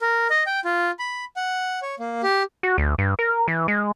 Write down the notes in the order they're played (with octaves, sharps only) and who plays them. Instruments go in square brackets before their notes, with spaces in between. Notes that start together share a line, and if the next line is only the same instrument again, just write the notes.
[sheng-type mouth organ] A#4
D#5
G5
F4
B5
F#5
C#5
A#3
G4
[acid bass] F#4
D2
G2
A#4
E3
G#3